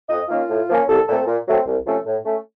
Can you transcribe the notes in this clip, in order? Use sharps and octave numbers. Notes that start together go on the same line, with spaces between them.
F2 D#5
D#3 A#3 C#4 F4
A2
F3 A#3 C#4
C2 A4
A#2 A3 C4 A4
A#2
F#3 A3 C4
C2
C3 F3 A3 C#4
A2
A3 C#4